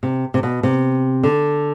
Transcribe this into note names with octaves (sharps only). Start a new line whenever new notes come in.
C3
C3
B2
C3
D3